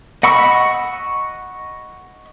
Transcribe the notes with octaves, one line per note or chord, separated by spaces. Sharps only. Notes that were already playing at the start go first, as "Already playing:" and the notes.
D#5 F#5 B5 C#6 E6